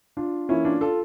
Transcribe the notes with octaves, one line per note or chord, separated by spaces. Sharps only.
D4 F4
E3 A#3 C#4 E4
D4 F4
F4 A4